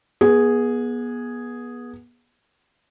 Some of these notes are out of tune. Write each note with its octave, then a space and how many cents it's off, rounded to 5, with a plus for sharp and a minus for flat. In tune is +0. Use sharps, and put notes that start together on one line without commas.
B3 -30 G#4 +0